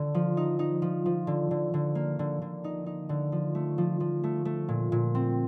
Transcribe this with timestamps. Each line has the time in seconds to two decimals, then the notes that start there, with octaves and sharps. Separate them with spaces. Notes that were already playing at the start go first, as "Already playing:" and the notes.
Already playing: D3
0.15 F3
0.37 D#4
0.59 D#4
0.82 F3
1.06 F3
1.27 D3
1.51 D3
1.74 D3
1.95 A#3
2.19 D3
2.42 D3
2.64 D#4
2.86 D#4
3.09 D3
3.32 F3
3.55 A3
3.78 F3
4.00 F3
4.24 A3
4.45 A3
4.69 A#2
4.92 A#2
5.15 C4